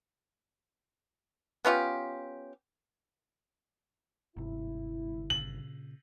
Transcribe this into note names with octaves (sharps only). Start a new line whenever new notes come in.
B3 C#4 F4 G4
G1 G#2 C3 E4
A#2 C#3 F#7